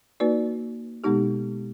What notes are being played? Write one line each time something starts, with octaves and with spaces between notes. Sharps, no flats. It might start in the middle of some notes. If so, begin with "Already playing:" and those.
A#3 D#4 F#4 B4 D5
B2 G#3 B3 D#4 G4